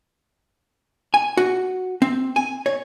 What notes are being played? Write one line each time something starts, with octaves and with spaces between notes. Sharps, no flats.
G#5
F#4
C4
G#5
C#5